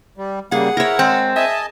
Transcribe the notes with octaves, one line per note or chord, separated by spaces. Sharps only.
G3
C#3 G3 A#3 G#4 F#5
E4 A#4 C#5
G#3 C4
D#5 E5 G#5 A5